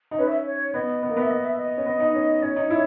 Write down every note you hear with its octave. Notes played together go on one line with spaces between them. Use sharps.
D#4
C#4 B4
E5
C#5
B3 D#5
B3
A#3
B3 E5
D#5
E5
D#5
C#4
B3
D#4
C#4
C#4 C#5
D#4
E4